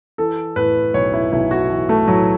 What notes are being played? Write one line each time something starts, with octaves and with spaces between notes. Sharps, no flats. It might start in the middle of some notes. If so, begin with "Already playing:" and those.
E3 A4
A2 B4
B1 C#5
E4
B1 E4
F#4
E3
A3
A2 F#3